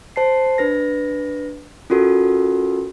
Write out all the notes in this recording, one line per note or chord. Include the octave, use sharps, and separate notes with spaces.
C5 A5 C7
D4 B4 A#6
C#4 F4 F#4 A4 A#4